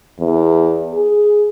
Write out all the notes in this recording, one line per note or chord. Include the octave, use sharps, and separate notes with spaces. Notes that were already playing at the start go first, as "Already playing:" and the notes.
E2
G#4